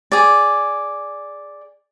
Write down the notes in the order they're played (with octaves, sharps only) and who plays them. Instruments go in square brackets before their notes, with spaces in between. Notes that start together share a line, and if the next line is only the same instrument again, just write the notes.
[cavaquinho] G#4 D5